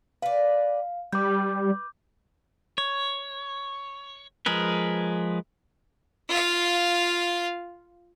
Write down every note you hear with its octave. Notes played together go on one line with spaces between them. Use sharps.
B4 D5 F5
G3 B4 D6 G6
C#5
F3 G#3 G#4 A#4 B4
F4 F5